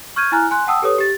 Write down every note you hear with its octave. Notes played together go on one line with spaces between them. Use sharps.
C#6 F6 G6 G#6 D#7
E4 G#5 A#5 F6 F#6
G#5 C6 F#6
F#5 G5 A5 D#6 E6
G4 A4 B4 C#5 D#6
G4 A6